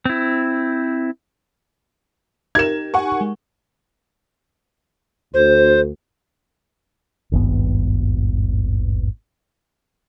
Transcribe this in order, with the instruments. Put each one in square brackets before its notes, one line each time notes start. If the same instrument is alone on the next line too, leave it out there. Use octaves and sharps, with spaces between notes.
[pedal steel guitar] C4 E4
[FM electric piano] D#4 G4 A#4 [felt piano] G#6 E7
[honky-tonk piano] F#5 G#5 C#6
[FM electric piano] G#3
[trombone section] D2 [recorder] C5
[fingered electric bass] D#1 G#1 G2 B3